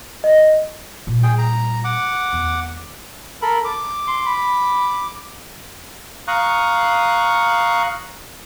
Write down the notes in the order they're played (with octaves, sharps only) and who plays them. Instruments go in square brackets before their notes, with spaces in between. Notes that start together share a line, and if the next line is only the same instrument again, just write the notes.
[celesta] D#5
[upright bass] A#2 G3
[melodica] G#4 G5
A#5
F#5 D6
[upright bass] E2 D#3
[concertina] A4 A#4 B5
D6
[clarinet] C6
B5
[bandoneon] F5 A#5 C#6 D#6 F#6